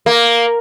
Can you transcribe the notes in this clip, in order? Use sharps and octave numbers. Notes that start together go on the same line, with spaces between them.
A#3